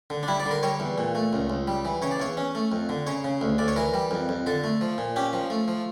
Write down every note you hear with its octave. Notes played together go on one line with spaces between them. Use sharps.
D3
D4
G3 E4
D5
D3
A#4
G3 C#5
E2
A#2
A3
C#2
C#2
G3
E3
C#3 C#5
D5
E2 C#5
C#4
A3
F2
D3
C#3 C#5
C#3
D2
D2 D5
C#5
E3 A#4
G3
F2
F2
D3 A4
A3
F3
A#2
C#4 G4
F3
A3
F3